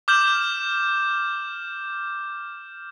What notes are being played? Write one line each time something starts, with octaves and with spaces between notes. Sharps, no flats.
D6 F6 G6 E7 F#7